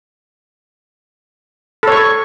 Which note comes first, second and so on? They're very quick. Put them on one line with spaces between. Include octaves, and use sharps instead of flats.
A4 C#5 C#6